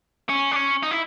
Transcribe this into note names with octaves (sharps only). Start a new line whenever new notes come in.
C#4
D4
C#4
D#4
E4